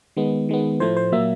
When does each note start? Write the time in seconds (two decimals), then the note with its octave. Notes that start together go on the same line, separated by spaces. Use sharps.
0.16 D#3 G#3 B3
0.49 D#3 G#3 B3
0.80 A2 F3 A3 C5
0.97 C5
1.12 A#2 F#3 A#3 E5